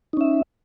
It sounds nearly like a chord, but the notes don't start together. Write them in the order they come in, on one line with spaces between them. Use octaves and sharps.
D#4 C#4 E5